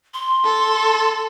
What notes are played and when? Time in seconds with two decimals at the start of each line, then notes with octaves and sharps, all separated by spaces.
0.14 C6
0.45 A4